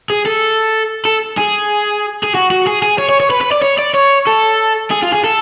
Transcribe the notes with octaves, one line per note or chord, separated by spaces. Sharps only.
G#4
A4
A4
G#4
G#4
F#4
F#4
G#4
G#4
C#5
C#5
C#5
B4
B4
D5
C#5
D5
C#5
A4
G#4
F4
G#4
A4